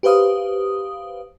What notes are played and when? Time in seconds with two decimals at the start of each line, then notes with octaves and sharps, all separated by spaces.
0.03 G4 B4 C5 F5 D#6